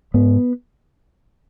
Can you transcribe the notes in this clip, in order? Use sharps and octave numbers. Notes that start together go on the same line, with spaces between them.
G#2 B3